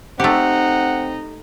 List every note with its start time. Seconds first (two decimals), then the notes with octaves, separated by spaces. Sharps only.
0.20 A3 C4 D#4 G4 F#5